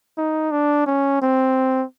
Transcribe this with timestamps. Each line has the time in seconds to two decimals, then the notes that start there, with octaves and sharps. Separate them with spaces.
0.17 D#4
0.51 D4
0.86 C#4
1.22 C4